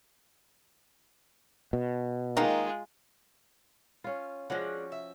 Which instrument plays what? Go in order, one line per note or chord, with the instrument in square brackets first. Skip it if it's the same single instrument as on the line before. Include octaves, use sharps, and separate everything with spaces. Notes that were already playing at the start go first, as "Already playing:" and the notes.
[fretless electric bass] B2
[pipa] D#3 A#3 D#4 [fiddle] G#3 F4
[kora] C#4 F4
[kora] F3 C#4 F#4 [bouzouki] G#3 D4
[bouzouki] E5